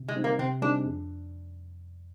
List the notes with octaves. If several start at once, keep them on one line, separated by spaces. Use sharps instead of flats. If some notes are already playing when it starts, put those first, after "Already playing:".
Already playing: C3
G#3
G3 C4 D#4
A#3
C3 C4
G3 C4 D4 D#4 G#4
F2